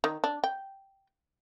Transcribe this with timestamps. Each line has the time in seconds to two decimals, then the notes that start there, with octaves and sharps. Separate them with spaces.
0.04 D#3
0.24 D4
0.44 G5